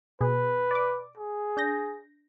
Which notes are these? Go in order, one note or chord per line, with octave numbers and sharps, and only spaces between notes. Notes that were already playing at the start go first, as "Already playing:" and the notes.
B2 G#4 B4
D5 D6
G#4
D4 G6 A#6